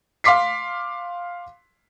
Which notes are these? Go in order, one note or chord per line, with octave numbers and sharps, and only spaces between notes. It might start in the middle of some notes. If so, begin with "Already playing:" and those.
F5 C6 D6 B6 C7